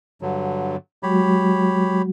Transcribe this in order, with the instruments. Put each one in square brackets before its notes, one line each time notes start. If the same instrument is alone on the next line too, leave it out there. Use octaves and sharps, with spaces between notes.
[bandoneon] G2 D3 F#3
[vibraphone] F#3 G#3 F#4 [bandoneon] G4 C#5 B5